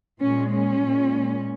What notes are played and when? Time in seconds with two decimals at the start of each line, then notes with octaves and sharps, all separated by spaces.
0.20 A#2 G#3 C#4
0.51 C#4
0.82 A#2 G#3